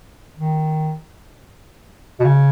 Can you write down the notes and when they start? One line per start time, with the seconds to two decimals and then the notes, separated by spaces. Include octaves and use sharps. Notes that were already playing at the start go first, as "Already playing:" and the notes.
0.37 D#3
2.20 B2
2.25 C#3